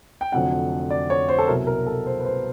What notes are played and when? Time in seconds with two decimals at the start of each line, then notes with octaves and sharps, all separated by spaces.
0.21 G5
0.32 F1 F2 D3 F#3 F#5
0.90 D5
1.10 C#5
1.29 C5
1.38 A4
1.47 C2 B2 F#3 A#4
1.67 A#4
1.86 A4
2.06 C5
2.20 B4
2.25 C5